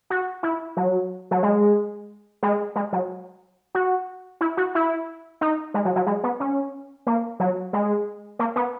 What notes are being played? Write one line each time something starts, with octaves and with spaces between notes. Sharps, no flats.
F#4
E4
F#3
F#3
G#3
G#3
G#3
F#3
F#4
E4
F#4
E4
D#4
G#3
F#3
F#3
G#3
B3
C#4
A#3
F#3
G#3
A#3
B3